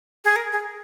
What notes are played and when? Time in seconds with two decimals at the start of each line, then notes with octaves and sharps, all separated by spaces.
0.25 G#4
0.36 A#4
0.52 G#4